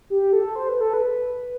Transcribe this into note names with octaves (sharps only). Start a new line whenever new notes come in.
G4
A4
C5
B4
A4
B4